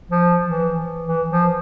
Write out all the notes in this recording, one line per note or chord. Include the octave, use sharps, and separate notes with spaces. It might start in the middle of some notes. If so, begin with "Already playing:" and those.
F3
E3
E3
F3